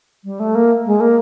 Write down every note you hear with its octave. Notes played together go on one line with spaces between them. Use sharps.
G3
A3
A#3
G#3
A#3